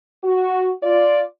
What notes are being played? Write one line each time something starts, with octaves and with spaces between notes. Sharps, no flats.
F#4
F4 D5